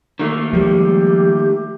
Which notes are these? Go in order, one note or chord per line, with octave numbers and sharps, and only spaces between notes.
D#3 A3 A#3
F3 G3 G#3 G4